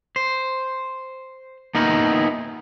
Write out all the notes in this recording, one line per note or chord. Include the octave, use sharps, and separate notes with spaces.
C5
A#3 B3 D#4 E4 A#4